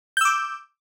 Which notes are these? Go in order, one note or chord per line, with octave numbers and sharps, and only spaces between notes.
D6 E6 G6